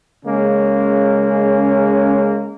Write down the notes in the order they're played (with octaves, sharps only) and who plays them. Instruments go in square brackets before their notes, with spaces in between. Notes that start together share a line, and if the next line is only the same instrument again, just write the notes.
[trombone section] C#3 G#3 A#3 C#4